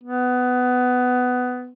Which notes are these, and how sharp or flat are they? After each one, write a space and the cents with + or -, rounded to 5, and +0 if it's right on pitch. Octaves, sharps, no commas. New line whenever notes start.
B3 +15